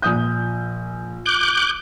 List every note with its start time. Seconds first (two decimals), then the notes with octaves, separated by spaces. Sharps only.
0.02 A#1 D#6 G6
1.26 D6 F#6 G6